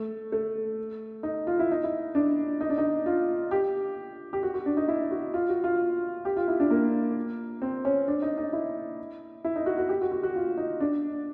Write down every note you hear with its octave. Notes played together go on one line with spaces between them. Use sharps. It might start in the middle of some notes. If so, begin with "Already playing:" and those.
Already playing: A3
A3
D#4
F4
E4
D#4
E4
D4
D#4
D4
D#4
F4
G4
G4
F#4
F#4
D4
D#4
E4
F#4
F4
F#4
F4
G4
F4
E4
D4
A#3
C4
C#4
D4
D#4
D#4
E4
E4
D#4
F#4
F#4
G4
F#4
F#4
F#4
F4
D#4
D4